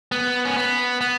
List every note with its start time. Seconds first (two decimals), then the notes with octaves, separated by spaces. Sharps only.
0.12 B3
0.45 C#4
0.57 B3
1.01 B3